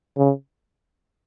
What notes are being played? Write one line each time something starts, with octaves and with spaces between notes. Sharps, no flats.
C#3